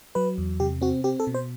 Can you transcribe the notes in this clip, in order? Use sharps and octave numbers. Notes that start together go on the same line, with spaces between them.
F#3 B4
E2
C3 G4
C4 F#4
C4 G4
A4
B2
C5